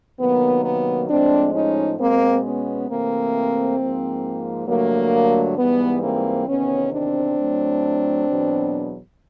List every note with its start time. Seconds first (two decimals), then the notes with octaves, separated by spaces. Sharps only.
0.20 C3 D#3 F#3 A#3 B3
0.64 B3
1.09 A2 F3 G#3 C4 D4
1.54 C#4 D#4
1.99 B2 G#3 A#3 C4
2.44 B3 C#4
2.89 C3 E3 A3 A#3 C4
3.78 G#2 F3 A#3
4.68 G2 D3 F#3 A3 A#3
5.58 G#2 E3 G3 B3
6.03 A#3 C4
6.48 E2 C3 D#3 B3 C#4
6.92 C4 D4
7.38 A2 F#3 A3
8.28 E2 B2 F#3